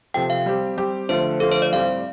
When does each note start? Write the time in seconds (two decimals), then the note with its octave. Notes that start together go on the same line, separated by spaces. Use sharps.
0.14 C3 F3 C4 A4 G5
0.30 F5
0.46 G3 C4 G4
0.77 G3 C4 G4
1.09 D3 F3 A3 F4 C5
1.40 D3 F3 A3 F4 A4
1.52 C5
1.62 D5
1.73 A2 G3 C4 G4 F5